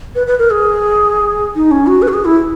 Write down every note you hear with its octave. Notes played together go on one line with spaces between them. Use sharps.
B4
B4
A#4
G#4
D#4
C#4
F#4
B4
F#4
G#4
E4